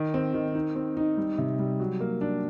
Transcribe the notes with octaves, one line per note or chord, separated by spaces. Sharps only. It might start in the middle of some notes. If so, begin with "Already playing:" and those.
Already playing: D#3
C4
D#3
D#4
C4
D#4
G3
C3
G3
F#3
A#3
D4